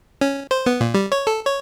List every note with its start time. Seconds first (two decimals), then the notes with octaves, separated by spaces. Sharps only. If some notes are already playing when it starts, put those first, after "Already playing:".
0.21 C#4
0.51 C5
0.66 B3
0.81 A#2
0.94 G3
1.12 C#5
1.27 A4
1.45 C#5